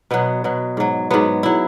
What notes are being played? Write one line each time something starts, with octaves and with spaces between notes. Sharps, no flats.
B2 F#3 B3
B2 F#3
G#2 F#3
G#2 F#3 B3
F#3 E4